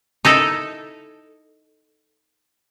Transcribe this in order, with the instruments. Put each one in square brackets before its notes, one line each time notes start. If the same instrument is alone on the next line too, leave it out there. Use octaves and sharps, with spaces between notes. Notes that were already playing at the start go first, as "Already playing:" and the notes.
[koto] D#4 E4 A4